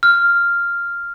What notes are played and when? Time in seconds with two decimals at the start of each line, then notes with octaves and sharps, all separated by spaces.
0.03 F6